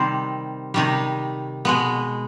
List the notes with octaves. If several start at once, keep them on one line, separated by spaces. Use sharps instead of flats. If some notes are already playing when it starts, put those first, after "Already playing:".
Already playing: C3 D#3 G3 C4 C5
C3 D#3 G3
B2 G#3 B3